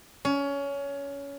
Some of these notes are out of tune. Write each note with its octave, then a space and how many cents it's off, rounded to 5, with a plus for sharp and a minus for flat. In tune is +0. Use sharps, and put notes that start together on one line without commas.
C#4 +20